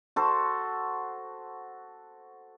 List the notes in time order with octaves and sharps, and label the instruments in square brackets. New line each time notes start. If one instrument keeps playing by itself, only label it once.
[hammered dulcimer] F#4 A4 C5